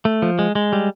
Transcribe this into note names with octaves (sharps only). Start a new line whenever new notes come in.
A3
F3
G#3
G#3
G3